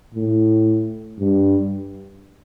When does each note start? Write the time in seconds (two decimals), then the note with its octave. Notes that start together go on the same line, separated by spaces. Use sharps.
0.15 A2
1.19 G2